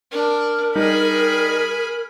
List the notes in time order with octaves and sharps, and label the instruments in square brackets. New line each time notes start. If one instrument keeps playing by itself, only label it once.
[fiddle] D4 [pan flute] A#4
[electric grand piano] G3 D#4 [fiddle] G#4 B5